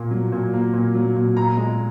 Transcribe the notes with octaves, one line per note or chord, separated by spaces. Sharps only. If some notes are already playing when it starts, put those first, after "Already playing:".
Already playing: A#2 A#3
F#3
A#2
A#3
A#2
F#3
A#2
A#2 A#5
G#3